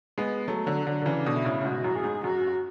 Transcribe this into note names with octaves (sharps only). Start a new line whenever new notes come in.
G#3 B3
F#3 A3
D3 F#3
D3 F#3
D3
C#3 E3 D4
B2 D3
E4
A2 C#3
C#3
G#2 B2 F#4
F#2 A2
G#4
G#2
F#2 F#4